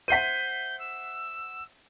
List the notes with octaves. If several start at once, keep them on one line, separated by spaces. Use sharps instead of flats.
C5 E5 F#5 G6 B6 C7 D#7
E6